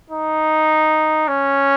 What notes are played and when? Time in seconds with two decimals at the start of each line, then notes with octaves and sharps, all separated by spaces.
0.10 D#4
1.28 C#4